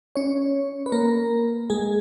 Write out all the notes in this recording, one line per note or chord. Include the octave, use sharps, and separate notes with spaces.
C#4 C#5
B4
A#3 A#4
G#3 G#4